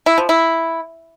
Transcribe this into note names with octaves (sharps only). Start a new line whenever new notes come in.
E4
F3
E4